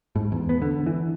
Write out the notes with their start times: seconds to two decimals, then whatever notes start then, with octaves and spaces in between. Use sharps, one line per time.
0.16 G#2
0.32 E2
0.49 B3
0.62 D3
0.86 E3